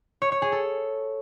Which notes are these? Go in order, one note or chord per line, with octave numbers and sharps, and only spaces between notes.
C#5
C#5
G#4
A4